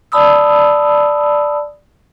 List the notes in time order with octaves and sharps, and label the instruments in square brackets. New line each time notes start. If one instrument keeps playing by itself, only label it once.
[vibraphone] D5 A5 B5 D#6 E6